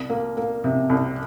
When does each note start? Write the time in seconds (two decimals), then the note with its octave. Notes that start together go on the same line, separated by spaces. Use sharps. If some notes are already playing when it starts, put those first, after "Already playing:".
Already playing: C2
0.10 A#3
0.37 A#3
0.64 C3
0.90 C2